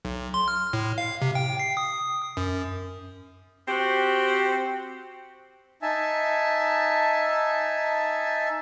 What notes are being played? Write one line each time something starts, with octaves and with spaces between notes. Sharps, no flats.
B1
C6
F6
A2
F5
C3
G5
C7
D#6
F#2
C4 F#4 G4 C5
D#4 E5 G#5 A5